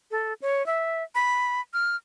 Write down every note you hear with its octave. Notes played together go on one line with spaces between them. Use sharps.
A4
C#5
E5
B5
F6